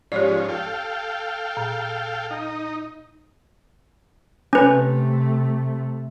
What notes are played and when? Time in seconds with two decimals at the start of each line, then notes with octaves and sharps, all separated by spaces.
0.12 G#2 F3 C#4 G4 C#5 D5
0.48 A4 F5 G5
1.57 A#2
2.31 D#4
4.53 C3 A3 C#4 B4